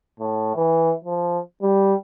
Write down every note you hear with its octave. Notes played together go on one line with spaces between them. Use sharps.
A2
E3
F3
G3